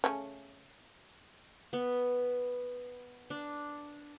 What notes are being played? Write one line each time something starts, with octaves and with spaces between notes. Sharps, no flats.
C#3 A3 C#4
B3
D4